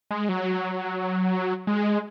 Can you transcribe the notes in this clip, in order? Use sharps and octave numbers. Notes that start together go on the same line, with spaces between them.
G#3
F#3
G#3